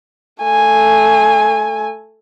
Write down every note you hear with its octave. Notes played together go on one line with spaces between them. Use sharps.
A3 G#5